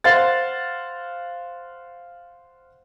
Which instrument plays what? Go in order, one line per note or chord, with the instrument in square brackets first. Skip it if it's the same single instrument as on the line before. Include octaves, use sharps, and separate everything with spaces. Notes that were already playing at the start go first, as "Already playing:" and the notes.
[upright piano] C5 F5 F#5 A6